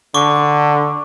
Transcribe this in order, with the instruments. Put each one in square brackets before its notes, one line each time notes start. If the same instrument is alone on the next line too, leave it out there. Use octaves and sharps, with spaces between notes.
[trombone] D3 [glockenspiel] C#6 D6